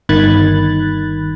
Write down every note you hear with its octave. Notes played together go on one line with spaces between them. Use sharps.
G1 D#3 B5 F#6 G#6 A6